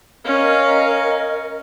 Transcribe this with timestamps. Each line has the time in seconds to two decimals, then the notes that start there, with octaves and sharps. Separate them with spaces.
0.25 C#4 A#4 D#5 F5